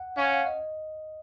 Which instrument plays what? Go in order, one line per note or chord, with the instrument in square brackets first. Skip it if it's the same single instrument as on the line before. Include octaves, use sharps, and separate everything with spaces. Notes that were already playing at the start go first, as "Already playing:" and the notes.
Already playing: [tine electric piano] F#5
[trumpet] C#4 [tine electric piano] F5
[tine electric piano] F#5
F5
D#5